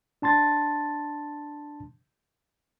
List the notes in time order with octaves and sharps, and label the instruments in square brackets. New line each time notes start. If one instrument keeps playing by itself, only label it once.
[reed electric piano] D4 A5 C6 A6